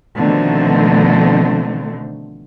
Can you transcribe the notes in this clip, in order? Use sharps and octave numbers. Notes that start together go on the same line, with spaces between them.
B2 D3 D#3 F3 A3 C4